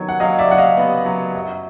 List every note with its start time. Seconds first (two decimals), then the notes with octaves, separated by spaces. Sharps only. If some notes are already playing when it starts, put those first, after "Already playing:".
Already playing: D#3 F#3 B3 C#5
0.09 F#5
0.20 F#3 D#5 F5
0.39 D5 E5
0.49 F#3 F#5
0.58 D#5 F5
0.77 B3
1.05 F#3
1.34 F#2